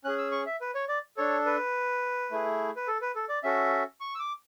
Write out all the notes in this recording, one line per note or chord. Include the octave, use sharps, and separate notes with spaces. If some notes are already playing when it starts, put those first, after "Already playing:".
C#4 G#4 F#6
E6
C#6
E5
B4
C#5
D5
D4 A4 C#5
B4
A3 E4 G#4
B4
A4
B4
A4
D5
C#4 F#4 A4 E5
C#6
E6
D6